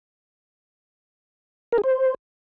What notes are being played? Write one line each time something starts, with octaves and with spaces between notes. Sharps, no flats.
A#4
G#4
C5